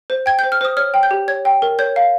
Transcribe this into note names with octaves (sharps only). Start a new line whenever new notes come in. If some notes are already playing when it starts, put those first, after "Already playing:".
C5
G5 G#6
C5 G6
F6
C5 D#6
C#5 F6
G5
G6
G4
C#5 G#6
G5
A#4
C#5 G6
F5